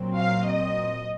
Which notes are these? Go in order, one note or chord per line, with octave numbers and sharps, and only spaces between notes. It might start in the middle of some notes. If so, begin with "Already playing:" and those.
Already playing: A#2 F#3 C4
F5
D#5